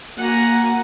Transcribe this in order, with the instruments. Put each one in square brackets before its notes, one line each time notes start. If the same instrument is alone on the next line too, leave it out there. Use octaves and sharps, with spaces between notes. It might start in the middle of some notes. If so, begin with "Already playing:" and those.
[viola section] A#3 F#4 F#5 [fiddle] G#5 A#5